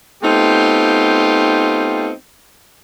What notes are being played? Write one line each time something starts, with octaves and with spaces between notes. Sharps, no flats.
A3 B3 C4 D#4 F4 G4